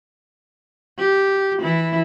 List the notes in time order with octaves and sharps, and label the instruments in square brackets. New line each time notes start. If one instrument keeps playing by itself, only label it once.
[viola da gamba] G4
E3 E4